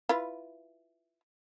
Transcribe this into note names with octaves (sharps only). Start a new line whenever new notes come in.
E4 F4 B4